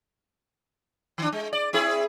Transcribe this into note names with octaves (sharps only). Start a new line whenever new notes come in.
D#3 D4
G#3
D5
C4 E4 G#4